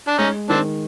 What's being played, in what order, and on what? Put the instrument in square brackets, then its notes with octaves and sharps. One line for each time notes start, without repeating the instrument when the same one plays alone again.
[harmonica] D4
[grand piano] G#3 [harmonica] C#4 D#4
[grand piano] D#3 [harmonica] C4 D4